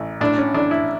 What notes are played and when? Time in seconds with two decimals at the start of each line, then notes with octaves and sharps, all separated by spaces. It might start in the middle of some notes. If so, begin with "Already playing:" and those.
Already playing: A1
0.21 A2 D4
0.38 C#4
0.54 A1 D4
0.71 E4